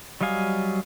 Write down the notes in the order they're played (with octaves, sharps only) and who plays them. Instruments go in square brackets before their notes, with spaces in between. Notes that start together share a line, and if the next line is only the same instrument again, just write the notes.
[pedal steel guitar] F#3 G3 D#5 F5 G#5